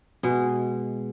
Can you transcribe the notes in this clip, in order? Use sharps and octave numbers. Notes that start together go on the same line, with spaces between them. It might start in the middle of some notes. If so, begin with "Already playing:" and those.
B2 G#3